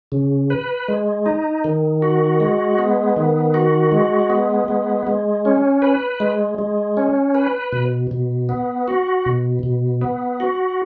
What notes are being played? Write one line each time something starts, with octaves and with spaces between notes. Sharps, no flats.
C#3
B4
G#3
D#4
D#3
F#4
G#3
B3
D#3
F#4
G#3
B3
G#3
G#3
C#4
B4
G#3
G#3
C#4
B4
B2
B2
B3
F#4
B2
B2
B3
F#4